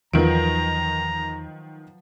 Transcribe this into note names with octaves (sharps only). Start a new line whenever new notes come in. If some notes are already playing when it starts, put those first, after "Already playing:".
E2 D#3 F3 F#3 B4 A#5 D7